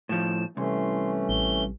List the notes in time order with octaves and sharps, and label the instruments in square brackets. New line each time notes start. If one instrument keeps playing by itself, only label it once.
[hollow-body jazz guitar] A2 F3 [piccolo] E7
[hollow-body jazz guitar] C2 [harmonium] E3 A3 C#4 [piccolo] C6
[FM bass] A1 [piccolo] G7